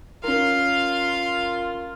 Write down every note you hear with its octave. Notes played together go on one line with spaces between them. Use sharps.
C#4 F4 A#4 F5 C6